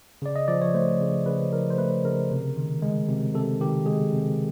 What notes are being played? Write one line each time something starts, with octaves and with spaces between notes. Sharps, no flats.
C#3 D5
D#5
F3 D5
C#5
A3 C5
C#3
C#3 B4
F3 A#4
C5
A3 B4
C#3 A#4
C3
D#3
G#3
C3
C3 A4
D#3 G4
G#3 G#4
C3